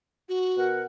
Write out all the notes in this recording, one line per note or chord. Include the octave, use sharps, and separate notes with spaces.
F#4
B2 A#4 F#5